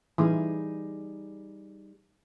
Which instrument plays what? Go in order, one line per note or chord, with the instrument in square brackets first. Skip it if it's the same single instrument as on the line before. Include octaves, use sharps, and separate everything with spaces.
[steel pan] E3 [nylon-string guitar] G3 D#4 G#4